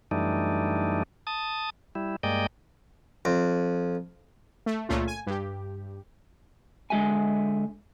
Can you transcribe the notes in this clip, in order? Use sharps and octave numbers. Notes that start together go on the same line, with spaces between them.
F#2 E3 G3 A3 D4 D#4
A5 D#6
G3 E4
G2 G#3 A#3 D5 D#5 G5
F2
A3
C#2 A#2 A3 C#4 F4
G#5
G2 G4
D3 G#3 G4 E5 G#5